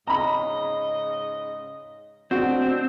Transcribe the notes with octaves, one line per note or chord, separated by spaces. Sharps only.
G#2 C#3 D#5 A#5 B5
A2 G#3 C4 D4 F#4